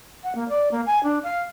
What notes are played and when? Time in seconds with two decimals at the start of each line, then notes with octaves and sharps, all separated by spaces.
0.23 F#5
0.35 A#3
0.49 D5
0.71 A#3
0.86 G#5
1.03 D4
1.23 F5